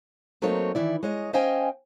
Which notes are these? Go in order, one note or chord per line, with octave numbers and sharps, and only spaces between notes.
F#3 A3 A#3 C4 D#4 C#5
D#3 E3 E4 D5
G#3 C#5 D#5
C#4 C5 D#5 F5 G5 G#5